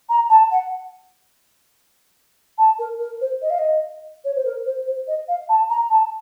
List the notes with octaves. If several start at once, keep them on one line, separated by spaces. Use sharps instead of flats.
A#5
A5
F#5
A5
A#4
A#4
C5
D#5
F5
D#5
C#5
C5
A#4
C5
C5
D#5
F5
A5
A#5
A5